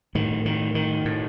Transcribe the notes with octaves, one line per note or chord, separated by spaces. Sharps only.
A2 D#3
D#3
D#3
A2